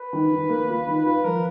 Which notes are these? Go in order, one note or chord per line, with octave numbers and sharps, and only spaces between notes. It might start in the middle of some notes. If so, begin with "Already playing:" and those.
Already playing: B4
D#3
D#3
A#3
F4
D#3
F4 B4
F3 A#4